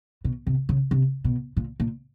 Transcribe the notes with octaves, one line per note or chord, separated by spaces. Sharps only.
B2
C3
C#3
C3
B2
A#2
A#2